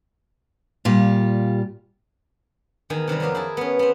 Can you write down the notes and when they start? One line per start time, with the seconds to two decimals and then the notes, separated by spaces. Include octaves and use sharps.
0.85 A#2 G3 F4 G4
2.90 E2 D#3 G#5
3.08 C3 D#3 E3 G3
3.20 F2 F#3 A#3 B3 A#4
3.35 E4 G#4 A#4 A5
3.57 B3 C#4
3.79 B3 C4